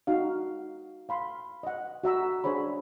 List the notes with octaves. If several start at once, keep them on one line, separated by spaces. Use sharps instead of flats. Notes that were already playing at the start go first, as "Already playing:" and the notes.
D#4 F#4 F5
F5 B5 C6
D#5 F#5
F#4 E5 A#5 E6
D4 G#4 C5 C#5 B5